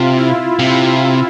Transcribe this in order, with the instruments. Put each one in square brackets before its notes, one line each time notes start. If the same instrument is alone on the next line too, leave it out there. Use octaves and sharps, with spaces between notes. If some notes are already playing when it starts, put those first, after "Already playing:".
Already playing: [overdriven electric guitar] C3 [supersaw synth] F4
[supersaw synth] E4
[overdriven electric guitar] C3